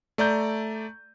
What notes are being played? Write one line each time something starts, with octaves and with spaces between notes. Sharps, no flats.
A3 D5 A#5 G6